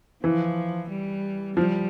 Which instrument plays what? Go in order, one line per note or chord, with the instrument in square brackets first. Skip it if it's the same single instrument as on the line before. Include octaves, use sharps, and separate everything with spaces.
[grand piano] E3 [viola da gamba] F3
[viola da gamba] G3
[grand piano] F3 [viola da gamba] G3